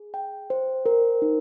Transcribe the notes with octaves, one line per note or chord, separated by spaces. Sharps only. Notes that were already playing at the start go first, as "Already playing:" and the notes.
Already playing: G#4
G5
C5
A#4
D#4